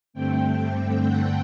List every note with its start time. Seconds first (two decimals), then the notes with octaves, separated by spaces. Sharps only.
0.14 G2 D3 A3 C4 G5
1.02 F#5